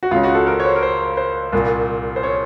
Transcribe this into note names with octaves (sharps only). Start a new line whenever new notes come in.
F#4
C#2 C#3 F4
F#4
A4
A#4
C#5
C5
A#4
C5
C5
C2 A#2
C5
C#5